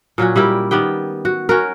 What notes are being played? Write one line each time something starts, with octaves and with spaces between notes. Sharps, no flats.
A#2 F#3 C#4 F#4
G3 E4 G4 A#4
D#3 B3 G4 G5
F#4
C#4 F#4 A#4